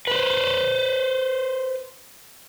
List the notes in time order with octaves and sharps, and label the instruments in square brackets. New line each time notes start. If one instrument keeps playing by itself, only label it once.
[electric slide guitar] B4 C5